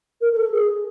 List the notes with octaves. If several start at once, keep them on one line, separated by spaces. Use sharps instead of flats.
A#4
A#4
A4
G#4